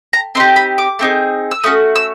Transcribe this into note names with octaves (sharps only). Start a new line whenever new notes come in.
A#5
C4 D#4 G4 C6
B5
D6
A3 C4 D#4 G#4
E6
A3 C#4 F#4 D#6
E6